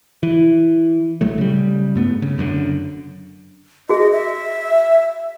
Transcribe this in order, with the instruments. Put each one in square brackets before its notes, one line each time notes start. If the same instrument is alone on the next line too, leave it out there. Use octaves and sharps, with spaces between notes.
[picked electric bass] E3
A#1 F#3 A3
C#3 G3
G2 A3 B3
C#3
F#1 F#2 A2 D3
[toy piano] F#4 G#4 [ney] D#5
[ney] E5